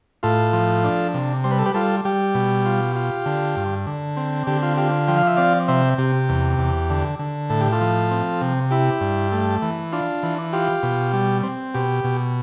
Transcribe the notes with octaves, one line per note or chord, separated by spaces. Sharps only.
A2 F4 A4
F3
D4
C3
G3 C5
B4
A4
G4 B4
G3 F4 A4
G3 G4
B2
F4
F4
D3
G2
D3
C4
D3 G4
F4
F4 G4
F3 G5
F5
E5
C4 D5 F5
C3 C5 E5
C3 G4
E2
E2
D3
D3
A2 A4
G4
F4 A4
F3
C4
C3
E4 G4
G2
A3
E3
D4 F4
E3
F4 G4
B2
G3
C4
B2 G4
B2